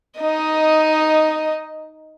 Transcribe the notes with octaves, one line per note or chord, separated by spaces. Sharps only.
D#4 D#5